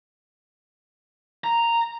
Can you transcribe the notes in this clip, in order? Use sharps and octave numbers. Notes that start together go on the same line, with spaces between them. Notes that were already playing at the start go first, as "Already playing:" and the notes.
A#5